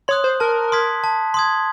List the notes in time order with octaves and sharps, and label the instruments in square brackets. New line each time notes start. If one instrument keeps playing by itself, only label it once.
[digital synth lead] C#5 [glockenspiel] C6 D#6 F#6
[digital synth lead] C5
[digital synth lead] A#4 [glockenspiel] A5
[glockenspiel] C6 D#6 G#6 B6
A5
C6 D#6 G#6